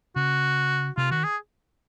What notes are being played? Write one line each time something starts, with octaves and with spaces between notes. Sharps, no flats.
C#3 F#4
C3 F4
D#3 F#4
G#4